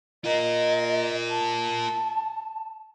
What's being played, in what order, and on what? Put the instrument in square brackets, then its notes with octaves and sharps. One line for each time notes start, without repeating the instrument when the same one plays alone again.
[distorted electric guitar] F4 A#4 [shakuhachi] D#5
[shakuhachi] A5